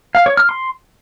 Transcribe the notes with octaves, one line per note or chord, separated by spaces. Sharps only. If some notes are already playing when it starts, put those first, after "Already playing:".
F5
C#5
F6
C6